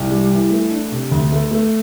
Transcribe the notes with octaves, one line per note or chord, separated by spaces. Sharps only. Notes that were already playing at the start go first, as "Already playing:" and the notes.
Already playing: C2
G3
E3
A3
D4
C3
D2
A3
A3